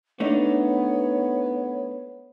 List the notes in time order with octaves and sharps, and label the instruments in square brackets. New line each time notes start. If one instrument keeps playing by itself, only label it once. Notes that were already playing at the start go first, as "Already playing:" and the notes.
[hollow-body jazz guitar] A3 D4 D#4 [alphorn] B3 [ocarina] C#5